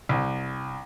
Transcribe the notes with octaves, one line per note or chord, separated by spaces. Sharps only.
C2